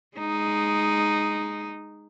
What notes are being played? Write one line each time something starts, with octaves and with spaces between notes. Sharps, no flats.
G#3 D#4